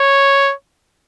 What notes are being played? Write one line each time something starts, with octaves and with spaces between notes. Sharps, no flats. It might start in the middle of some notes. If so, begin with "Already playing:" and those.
Already playing: C#5